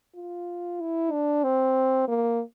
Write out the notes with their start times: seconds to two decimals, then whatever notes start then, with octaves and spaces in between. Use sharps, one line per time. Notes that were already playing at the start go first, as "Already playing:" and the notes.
0.15 F4
0.80 E4
1.12 D4
1.44 C4
2.08 A#3